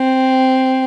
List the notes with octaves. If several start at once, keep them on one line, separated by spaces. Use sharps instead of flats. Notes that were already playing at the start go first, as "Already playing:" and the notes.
Already playing: C4